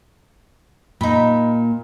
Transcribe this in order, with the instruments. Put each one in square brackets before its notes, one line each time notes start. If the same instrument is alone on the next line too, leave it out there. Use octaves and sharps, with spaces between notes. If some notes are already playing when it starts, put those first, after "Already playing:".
[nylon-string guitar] A#2 A#3 [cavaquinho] D#4 B5